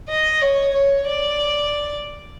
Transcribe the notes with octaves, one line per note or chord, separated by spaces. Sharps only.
D#5
C#5
C#5
D5